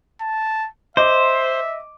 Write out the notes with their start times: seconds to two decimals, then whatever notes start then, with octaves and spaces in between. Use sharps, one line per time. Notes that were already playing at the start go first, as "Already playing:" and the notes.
0.21 A5
0.97 C5 D#5 E5 D6